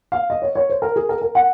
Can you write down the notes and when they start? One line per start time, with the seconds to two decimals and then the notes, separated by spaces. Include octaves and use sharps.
0.12 F5
0.30 D#5
0.42 C#5
0.55 C#5
0.70 C5
0.82 A#4
0.96 G#4
1.09 A#4
1.22 A#4
1.35 F#5